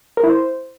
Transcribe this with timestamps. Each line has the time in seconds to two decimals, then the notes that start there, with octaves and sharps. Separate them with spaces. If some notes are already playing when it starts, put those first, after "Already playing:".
0.17 A#4
0.23 E4
0.30 C5